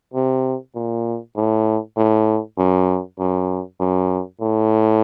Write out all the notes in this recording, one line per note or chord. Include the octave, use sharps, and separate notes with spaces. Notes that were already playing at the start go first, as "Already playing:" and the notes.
C3
A#2
A2
A2
F#2
F#2
F#2
A2